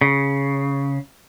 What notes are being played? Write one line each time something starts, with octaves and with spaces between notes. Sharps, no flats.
C#3